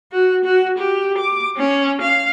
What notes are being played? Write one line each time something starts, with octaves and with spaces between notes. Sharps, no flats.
F#4
F#4
G4
D6
C#4
F5